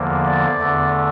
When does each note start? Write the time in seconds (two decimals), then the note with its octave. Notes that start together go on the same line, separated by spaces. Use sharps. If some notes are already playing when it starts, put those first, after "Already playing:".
Already playing: E2 D3 F3 A#3
0.26 D5
0.60 E2 D3 A3